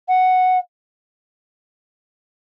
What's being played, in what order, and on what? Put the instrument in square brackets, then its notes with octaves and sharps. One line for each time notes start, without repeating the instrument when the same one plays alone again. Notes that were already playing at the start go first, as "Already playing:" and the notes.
[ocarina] F#5